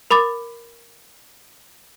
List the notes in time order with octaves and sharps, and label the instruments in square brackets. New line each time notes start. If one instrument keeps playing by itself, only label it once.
[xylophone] A#4 B5 D6 A6